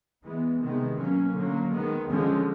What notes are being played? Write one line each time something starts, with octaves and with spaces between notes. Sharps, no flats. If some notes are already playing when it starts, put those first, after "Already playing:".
E3 G#3 B3
C3 D#3 G#3 B3
B2 F#3 A#3 C#4
D3 F#3 A#3
D#3 G#3 B3
D3 F3 G#3 C#4